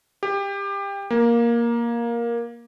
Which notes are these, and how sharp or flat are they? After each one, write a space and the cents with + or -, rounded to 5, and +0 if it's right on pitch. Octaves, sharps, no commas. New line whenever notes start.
G4 +25
A#3 +10